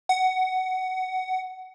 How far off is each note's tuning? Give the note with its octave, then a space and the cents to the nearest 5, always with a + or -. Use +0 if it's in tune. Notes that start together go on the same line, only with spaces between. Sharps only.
F#5 +15